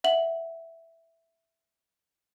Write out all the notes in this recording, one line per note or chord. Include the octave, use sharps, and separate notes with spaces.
E5 F#5 F#7